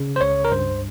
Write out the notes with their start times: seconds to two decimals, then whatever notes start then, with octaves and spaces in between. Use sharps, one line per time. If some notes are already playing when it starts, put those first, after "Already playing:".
Already playing: C#3
0.16 C5
0.20 C#2 C#5
0.45 A#4
0.52 G2 C5